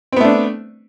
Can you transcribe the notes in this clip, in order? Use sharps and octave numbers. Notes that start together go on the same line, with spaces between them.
A3 B3 C4 D4